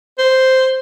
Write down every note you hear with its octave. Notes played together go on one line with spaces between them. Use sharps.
C5